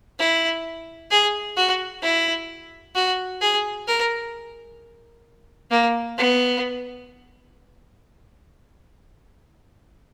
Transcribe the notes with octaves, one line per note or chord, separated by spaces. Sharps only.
E4
G#4
F#4
E4
F#4
G#4
A#4
A#3
B3